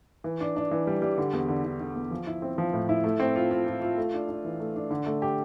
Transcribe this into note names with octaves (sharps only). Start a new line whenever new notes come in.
E3
D4
D4
E3
G3
G3
D3
E2
D3
D3
D3
E2
F3
E4
C4
F3
A2
E4
A3
C4
F4
F4
F4
F4
A3
D4
D4
E3
A3
D4
D3
A3
G4